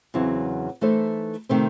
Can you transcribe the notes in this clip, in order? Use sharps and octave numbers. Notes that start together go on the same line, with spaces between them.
E2 C#3 F#3 C4 E4
E3 A3 D#4 A4 C5
C3 D#3 A3 C4